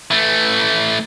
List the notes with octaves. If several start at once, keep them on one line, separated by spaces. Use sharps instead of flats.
E3 A3